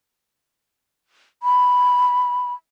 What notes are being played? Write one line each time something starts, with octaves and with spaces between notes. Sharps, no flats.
B5